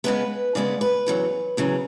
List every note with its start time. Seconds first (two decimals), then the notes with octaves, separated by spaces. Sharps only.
0.04 C#3 G#3 B3 B4
0.55 C#3 G#3 B3 D5
0.81 B4
1.06 E2 C#3 F#3
1.57 E2 C#3 F#3